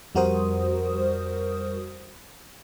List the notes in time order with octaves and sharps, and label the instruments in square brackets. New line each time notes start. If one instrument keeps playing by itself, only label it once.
[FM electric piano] F2 G3 F#4 A#4 C5 D#6